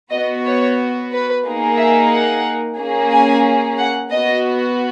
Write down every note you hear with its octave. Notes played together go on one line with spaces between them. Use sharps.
B3 F#4 D#5
C#5
B4
A#3 D#4 G#4
E5
F#5
A#3 C#4 G#4
G#5
F#5
B3 F#4 D#5